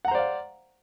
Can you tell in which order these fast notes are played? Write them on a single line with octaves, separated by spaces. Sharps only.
F#5 A#5 C5 D5 F5